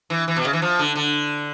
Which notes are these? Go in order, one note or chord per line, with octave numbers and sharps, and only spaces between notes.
E3
E3
B2
C#3
E3
F3
D3
D3